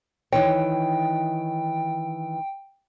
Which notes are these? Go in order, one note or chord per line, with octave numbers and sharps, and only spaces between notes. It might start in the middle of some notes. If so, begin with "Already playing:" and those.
D#3 E3 C#5 G5